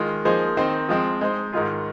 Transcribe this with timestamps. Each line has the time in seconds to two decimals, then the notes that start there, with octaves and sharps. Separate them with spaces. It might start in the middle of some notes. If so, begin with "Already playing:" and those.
Already playing: D#3 G#3 F4
0.25 F3 A#3 D#4 G#4 C5
0.57 D#3 C4 D#4 C5
0.89 F3 G#3 C4
1.21 G#3 D#4 C5
1.53 G#2 D#3 G#3 F4 G#4